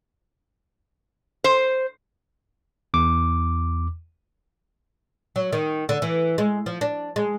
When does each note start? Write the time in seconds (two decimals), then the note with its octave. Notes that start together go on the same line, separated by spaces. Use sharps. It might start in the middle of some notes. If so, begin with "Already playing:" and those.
1.44 C5
2.94 E2 D6
5.36 F#3
5.53 D#3
5.89 D3
6.02 E3
6.38 G#3
6.66 F3
6.81 D4
7.16 G#3